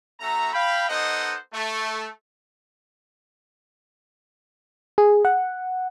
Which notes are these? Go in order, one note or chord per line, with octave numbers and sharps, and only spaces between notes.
A3 C#4 F#4 E5 A#5
F5 G5 B5
B3 D#4 A4 C5 D#5 F#5
A3
G#4
F#5